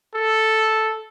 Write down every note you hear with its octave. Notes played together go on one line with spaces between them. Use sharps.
A4